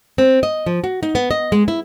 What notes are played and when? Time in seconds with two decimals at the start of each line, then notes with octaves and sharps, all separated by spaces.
0.18 C4
0.43 D#5
0.66 F3
0.84 F#4
1.03 D#4
1.15 B3
1.31 D#5
1.52 G#3
1.68 E4